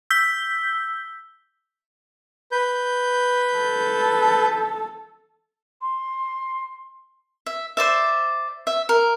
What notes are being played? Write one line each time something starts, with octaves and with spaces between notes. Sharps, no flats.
E6 G6 B6 G7
B4 G6
A4
C6
E5
C5 D5 E5
E5
A#4